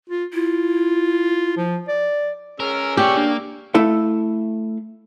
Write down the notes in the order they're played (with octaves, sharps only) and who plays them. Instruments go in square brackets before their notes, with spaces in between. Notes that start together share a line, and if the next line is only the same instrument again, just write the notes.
[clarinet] F4
[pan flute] E4 [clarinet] F4
[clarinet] F3
D5
[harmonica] C#4 G#4 E6 [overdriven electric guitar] A#4
[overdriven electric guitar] A#3 D5 [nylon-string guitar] G4 [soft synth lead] C#6
[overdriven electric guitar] A#3 [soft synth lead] D4
[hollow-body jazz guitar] A3 E4 A4 F5